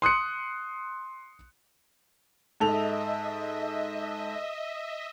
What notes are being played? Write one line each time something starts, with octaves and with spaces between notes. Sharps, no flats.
C6 D#6 F#6 C#7
G#2 A4 D#5 E5 F7